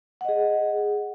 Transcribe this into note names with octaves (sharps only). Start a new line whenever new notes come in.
G#4 D#5 F#5